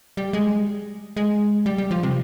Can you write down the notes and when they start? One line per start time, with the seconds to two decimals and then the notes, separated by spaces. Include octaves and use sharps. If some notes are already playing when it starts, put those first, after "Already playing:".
0.17 G3
0.33 G#3
1.17 G#3
1.66 G3
1.78 G3
1.91 F3
2.03 C3